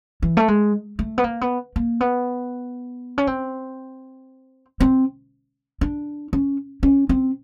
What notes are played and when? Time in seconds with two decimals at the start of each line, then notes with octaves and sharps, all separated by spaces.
0.22 E3
0.37 A3
0.48 G#3
0.99 A3
1.18 B3
1.24 A#3
1.41 B3
1.76 A#3
2.01 B3
3.18 C#4
3.27 C4
4.80 C4
5.81 D4
6.33 C#4
6.83 C#4
7.09 C4